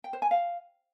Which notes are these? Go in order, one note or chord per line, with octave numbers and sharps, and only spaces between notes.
G5
C5
G#5
F5